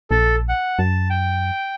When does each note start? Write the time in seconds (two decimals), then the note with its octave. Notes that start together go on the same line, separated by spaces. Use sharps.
0.11 A#1 A4
0.49 F#5
0.79 F#2 A5
1.10 G5